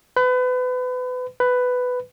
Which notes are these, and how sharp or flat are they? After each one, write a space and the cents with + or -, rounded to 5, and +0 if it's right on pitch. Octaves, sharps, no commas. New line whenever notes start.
B4 +30
B4 +10